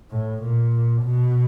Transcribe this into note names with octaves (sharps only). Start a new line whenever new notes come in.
A2
A#2
B2